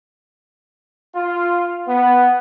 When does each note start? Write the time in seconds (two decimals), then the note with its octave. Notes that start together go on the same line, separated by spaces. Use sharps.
1.14 F4
1.87 B3